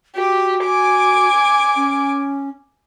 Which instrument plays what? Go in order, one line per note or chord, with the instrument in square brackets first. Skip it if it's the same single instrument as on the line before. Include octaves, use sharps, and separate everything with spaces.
[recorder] F#4 [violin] G4
[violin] G#5 D6
[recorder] C#4